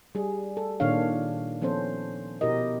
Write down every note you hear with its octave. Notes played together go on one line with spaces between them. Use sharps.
G3 G#4
A4
A#2 D#3 D4 C#5 F5
F3 B3 C#4 A4 C5
B2 E4 G4 A#4 D#5